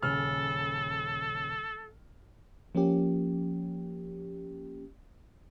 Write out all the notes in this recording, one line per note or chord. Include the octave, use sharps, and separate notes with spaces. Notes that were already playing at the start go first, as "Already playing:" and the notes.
D#1 C#3 A4 F6
F3 A#3 C#4 G4